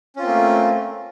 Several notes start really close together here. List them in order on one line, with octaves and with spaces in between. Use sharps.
C#4 F4 C4 A#3 A3